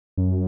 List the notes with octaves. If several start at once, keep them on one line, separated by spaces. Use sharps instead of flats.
F#2